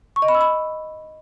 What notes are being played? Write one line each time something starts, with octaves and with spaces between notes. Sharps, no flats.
C#6
D#5
B5
E6
B5